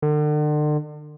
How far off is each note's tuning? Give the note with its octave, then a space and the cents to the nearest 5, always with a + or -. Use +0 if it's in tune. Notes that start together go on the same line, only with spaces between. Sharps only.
D3 +40